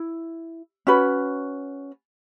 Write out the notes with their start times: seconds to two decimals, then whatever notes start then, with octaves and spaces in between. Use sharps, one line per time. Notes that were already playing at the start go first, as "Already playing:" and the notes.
Already playing: E4
0.87 C#4 F#4 B4